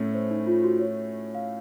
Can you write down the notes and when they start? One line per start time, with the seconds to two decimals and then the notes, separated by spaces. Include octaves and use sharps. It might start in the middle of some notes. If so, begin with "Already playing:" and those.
Already playing: A2 A3 C#4 C#5
0.14 C5
0.31 D#4
0.47 F4
0.64 F#4
0.80 C#5
1.35 F5